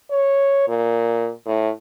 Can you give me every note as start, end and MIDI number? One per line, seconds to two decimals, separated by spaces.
0.11 0.65 73
0.68 1.31 46
1.46 1.70 45